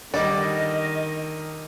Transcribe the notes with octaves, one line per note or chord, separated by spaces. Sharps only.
D3 D#3 G3 D5 D#5